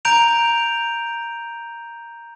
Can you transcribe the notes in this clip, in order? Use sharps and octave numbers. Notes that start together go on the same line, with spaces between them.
A#5 G6 D7 F7